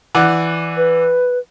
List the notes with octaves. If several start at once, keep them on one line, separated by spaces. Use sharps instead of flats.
E3 D5 F#5
B4